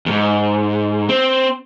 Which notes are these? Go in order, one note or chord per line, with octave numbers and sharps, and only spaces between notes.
E2 G#2
C4